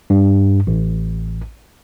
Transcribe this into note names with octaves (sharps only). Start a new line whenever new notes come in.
G2
A1